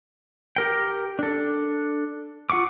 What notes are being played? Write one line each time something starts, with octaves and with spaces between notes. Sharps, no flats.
G4 A#4 G5
D4 A4
F4 F#5 C#6 D6